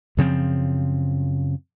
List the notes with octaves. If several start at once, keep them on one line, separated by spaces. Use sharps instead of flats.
F#2 C#3 F3 C4